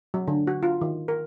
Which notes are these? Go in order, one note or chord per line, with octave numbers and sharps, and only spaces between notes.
F#3
D3
F#4
F4
D#3
A#4